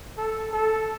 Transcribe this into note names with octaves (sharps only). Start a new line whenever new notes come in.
A4
A4